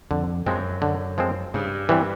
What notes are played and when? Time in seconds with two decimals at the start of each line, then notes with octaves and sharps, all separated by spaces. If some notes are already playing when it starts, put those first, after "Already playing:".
0.11 F2 D3
0.46 F#2 F3 G#3 C4
0.82 D3
1.18 F3 G#3 C4
1.54 G2 C#3
1.89 E3 G3 C4